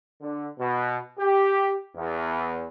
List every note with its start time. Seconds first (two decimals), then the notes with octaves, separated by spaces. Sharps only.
0.21 D3
0.59 B2
1.18 G4
1.96 E2